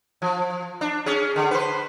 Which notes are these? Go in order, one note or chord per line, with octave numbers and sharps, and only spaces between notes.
F3
D4
C#4 G#4
D3
B4 C5